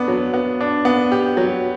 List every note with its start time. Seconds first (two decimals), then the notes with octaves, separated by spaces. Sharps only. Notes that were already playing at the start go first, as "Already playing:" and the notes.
Already playing: B3 D4
0.08 F#3
0.34 B3
0.61 D4
0.85 B3
1.12 G4
1.37 F#3